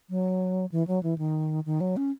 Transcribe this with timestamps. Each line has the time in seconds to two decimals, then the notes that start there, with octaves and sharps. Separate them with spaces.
0.10 F#3
0.72 E3
0.88 F#3
1.03 E3
1.18 D#3
1.66 D#3
1.81 F#3
1.97 C#4